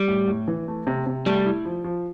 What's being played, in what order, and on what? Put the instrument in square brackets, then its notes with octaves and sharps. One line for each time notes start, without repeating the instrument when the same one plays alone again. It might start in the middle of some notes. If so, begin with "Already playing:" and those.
Already playing: [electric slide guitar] G3
[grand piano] A2
A2
E3
A3
C3
C3
[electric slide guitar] G3 [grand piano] A3
[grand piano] E4
F3
F3